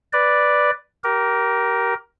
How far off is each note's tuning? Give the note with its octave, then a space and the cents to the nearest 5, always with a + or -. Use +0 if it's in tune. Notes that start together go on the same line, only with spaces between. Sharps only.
B4 +0 D5 +0
G4 -25 A#4 +10